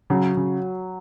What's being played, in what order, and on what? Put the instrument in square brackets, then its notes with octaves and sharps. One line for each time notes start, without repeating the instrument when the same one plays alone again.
[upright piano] C#3 [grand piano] F#3
[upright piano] C#3